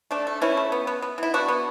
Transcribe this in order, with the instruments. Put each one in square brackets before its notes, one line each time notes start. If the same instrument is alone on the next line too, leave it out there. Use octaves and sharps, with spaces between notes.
[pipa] A3 D4
A3
E3 C#4 E4
A3
B3
B3
B3
E3 E4
B3 D4 F#4
B3